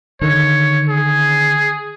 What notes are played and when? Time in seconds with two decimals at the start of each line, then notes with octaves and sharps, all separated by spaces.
0.21 D3 D#3 C#5
0.88 G#4